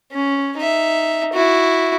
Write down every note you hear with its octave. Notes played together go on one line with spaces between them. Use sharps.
C#4
D#4 E5
E4 F#4